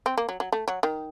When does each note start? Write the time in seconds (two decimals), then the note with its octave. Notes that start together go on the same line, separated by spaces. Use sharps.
0.06 C4
0.17 A#3
0.29 F#3
0.40 F#3
0.52 A3
0.68 F#3
0.83 D#3